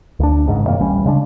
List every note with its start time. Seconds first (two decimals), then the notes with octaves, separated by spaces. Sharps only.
0.19 D2 D4
0.47 G#1 G#2 C#3
0.66 F#2 C3 D#3 A#3
0.79 D1 A1 G3 C#4
1.06 C#3 G#3 D4